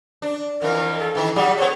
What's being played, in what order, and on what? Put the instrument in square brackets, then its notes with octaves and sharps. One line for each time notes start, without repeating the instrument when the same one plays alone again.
[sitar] D4
[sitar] F2 E3 [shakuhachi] A#4
[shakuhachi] A4
[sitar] D#3 E3 E4
[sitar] F#3 G3 G#4 [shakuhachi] F#5
[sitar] B3 A4 [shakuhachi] C#5